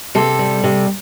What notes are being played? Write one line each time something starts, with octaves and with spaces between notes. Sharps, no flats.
C3 A4
G3
C3